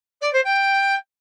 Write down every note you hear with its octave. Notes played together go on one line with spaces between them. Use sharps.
D5
C5
G5